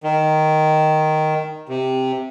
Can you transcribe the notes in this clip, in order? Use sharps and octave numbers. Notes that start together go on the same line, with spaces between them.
D#3
C3